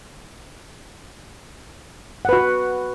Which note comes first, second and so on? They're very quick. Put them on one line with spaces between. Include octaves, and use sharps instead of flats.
F#5 B4 F#4